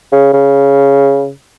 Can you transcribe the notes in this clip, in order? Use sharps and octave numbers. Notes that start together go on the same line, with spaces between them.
C#3
C#3